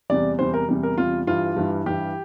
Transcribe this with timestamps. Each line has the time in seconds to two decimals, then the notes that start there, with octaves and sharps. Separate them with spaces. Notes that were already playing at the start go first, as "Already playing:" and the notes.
0.10 E2 C3 G3 D5
0.39 E2 C3 G3 C5
0.54 A#4
0.69 E2 C3 G3
0.83 A#4
0.98 E2 C3 G3 F4
1.27 G2 E3 G3 F4
1.56 G2 E3 G3
1.86 G2 E3 G3 G4